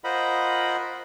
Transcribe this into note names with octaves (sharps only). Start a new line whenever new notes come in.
F4 A#4 C5 D#5 F#5 B5